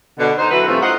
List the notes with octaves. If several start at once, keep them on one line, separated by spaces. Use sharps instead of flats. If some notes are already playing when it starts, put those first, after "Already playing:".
B2 D3
D#4 C5
E3 F#3 E4 F#4 A4 B4
G2 C3 F3 A3 C#4 F4
D#4 F4 C5 D#5 F#5